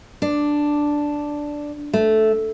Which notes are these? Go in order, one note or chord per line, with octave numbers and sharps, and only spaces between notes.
D4
A3